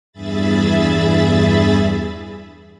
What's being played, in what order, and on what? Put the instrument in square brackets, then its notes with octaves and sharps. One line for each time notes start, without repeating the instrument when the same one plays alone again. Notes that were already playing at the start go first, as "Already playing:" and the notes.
[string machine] E2 G2 G#4 E5 B5 A6